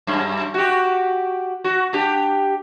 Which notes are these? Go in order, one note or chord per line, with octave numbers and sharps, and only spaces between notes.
F#2
F#4 G4
F#4
D4 G4